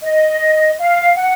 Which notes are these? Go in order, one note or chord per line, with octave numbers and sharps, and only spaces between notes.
D#5
F5
F#5